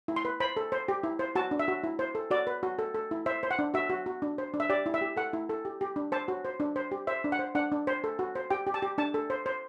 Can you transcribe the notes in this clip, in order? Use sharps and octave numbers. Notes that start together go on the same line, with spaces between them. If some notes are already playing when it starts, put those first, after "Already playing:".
E4
C6
B4
C5 B5
A4
C5
G4
E4
C5
F#4 A5
D4
E5
F#4
E4
C5
A4
F#4 D5
B4
F#4
A4
A4
E4
C5 E5
C5
F#5
D4
F#4 E5
F#4
F#4
D4
C5
D4
E5
G4 D5
E4
E5
G4
A4 F#5
E4
A4
G4
G4
D4
C5 A5
F#4
C5
D4
C5
G4
C5 E5
D4
F#5
C5
D4 F#5
D4
C5
A4
F#4
C5
G4 G5
G4
A5
G4
D4 A5
A4
C5
C5